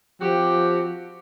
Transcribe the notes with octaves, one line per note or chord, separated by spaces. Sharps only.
F3 C4 F#4 G4